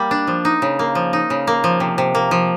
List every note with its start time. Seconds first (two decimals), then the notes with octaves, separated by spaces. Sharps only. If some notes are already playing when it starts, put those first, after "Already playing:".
Already playing: G3 A#3
0.11 D4
0.27 F3
0.45 D#4
0.62 C#3
0.79 A#3
0.95 F3
1.13 D#4
1.30 C#3
1.47 A#3
1.64 F3
1.80 C3
1.98 C3
2.15 A#3
2.31 F3